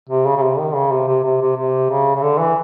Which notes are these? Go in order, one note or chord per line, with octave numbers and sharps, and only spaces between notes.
C3
C#3
C#3
C3
D#3
C#3
C3
C3
C3
C3
C3
C#3
C#3
D3
E3